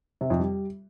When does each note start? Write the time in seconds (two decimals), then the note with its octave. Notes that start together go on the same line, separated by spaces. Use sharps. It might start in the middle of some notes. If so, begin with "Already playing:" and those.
0.21 C3
0.30 F2
0.40 G3